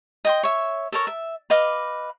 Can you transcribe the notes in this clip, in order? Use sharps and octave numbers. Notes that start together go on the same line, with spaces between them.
D#5 G5 C6
C#5 E5
A4 A#4 C#5
E5
B4 D#5 F5 D6